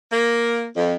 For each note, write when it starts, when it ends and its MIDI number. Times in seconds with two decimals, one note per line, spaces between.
0.11 0.65 58
0.76 0.94 41